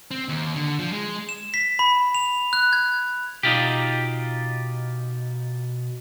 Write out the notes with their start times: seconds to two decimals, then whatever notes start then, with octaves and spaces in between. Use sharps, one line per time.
0.11 C4
0.29 D#2
0.56 D3
0.79 F3
0.92 G#3
1.29 E7
1.54 B6
1.79 B5
2.15 F7
2.53 F#6
2.73 G#6
3.43 B2 D#4 F4 G4